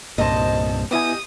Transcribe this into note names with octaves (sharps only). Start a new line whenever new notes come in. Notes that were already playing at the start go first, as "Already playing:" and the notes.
C2 G2 A#2 C5 D#5 A5
B3 E4 G4 D#5 G#5 D#6